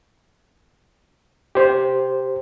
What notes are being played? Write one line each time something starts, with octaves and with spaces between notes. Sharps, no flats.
G4 C5